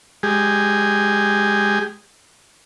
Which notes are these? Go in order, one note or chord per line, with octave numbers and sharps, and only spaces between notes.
G#3 G4 G#4